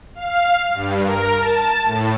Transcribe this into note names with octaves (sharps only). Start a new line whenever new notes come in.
F5
G2
A#4
A5
A2